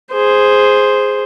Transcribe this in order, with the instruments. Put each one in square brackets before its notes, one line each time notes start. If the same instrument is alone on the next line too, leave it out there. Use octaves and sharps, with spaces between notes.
[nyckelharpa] G#4 C5